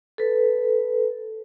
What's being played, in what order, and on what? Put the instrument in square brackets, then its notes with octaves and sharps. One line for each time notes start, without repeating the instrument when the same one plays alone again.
[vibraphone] A4 B4